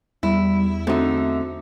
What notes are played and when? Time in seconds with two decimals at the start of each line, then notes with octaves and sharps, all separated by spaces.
0.23 E2 G3 E4
0.87 D3 A3 C4 D#4 F#4 E5